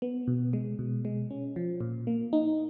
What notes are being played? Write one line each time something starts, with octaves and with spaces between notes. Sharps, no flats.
B3
B2
G#3
B2
G#3
C#4
F3
A#2
A#3
D#4